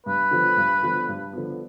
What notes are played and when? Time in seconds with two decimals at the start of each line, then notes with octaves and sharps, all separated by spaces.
0.06 G2 B4
0.31 D3 F3 B3
0.57 G2
0.83 D3 F3 B3
1.08 G2
1.33 D3 F3 B3